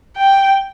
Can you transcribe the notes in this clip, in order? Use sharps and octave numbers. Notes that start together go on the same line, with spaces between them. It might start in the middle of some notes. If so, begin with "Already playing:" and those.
G5